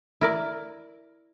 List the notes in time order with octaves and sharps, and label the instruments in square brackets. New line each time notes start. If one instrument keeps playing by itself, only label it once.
[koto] E4 A#4 D5